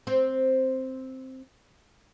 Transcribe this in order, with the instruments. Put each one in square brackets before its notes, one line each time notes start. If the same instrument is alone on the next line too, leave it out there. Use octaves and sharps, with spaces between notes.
[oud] C4 C5